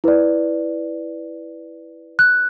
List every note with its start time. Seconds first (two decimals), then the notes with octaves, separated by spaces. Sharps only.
0.04 E4 B4 D5
2.19 F#6